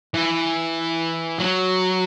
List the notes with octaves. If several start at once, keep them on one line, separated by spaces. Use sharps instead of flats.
E3
F#3